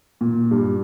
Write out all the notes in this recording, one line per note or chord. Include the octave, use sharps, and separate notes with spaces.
A#2
G2